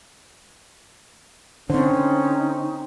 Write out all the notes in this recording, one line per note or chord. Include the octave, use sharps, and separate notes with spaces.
D3 C4 C#4 D#4 C5